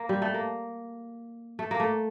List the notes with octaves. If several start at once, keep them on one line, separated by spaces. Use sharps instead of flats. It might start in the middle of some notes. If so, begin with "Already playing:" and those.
Already playing: A#3
G3
A3
A#3
A3
A#3
A3